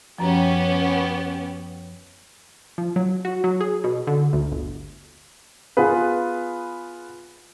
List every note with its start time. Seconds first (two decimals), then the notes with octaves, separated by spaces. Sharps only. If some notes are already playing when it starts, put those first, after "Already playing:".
0.18 F#2 F3 B3 C#4 G4
2.78 F3
2.96 F#3
3.25 F#4
3.44 F#3
3.61 G#4
3.84 B2
4.07 D3
4.33 D2
4.52 G1
5.77 B3 F4 G#4 B4